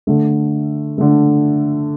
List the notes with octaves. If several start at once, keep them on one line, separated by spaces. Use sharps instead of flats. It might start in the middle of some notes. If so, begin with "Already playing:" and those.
D3 A3
D3 A3